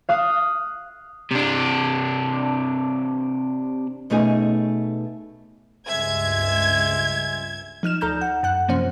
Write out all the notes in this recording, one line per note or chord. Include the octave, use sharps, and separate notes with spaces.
F5 D#6 F#6
C3 D4
B2 A3 C#4 D#4 G#4
C#2 G2 G#3 E5 G#6
F3 D#4 F6 E7
D2 A4 A#5 F6 G6
F#5
F#2 F#5 F#6
F#2 C3 F3 A#3 C#4 C5